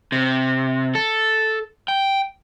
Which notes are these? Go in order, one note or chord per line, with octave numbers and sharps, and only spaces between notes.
C3
A4
G5